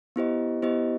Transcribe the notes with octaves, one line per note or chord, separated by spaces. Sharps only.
B3 E4 G4 C5 D#5
B3 E4 G4 C5 D#5